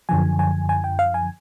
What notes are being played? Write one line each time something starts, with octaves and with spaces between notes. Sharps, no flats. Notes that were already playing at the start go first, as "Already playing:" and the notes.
F#2 D3 F3 G#5
G#5
G#5
G5
F5
G#5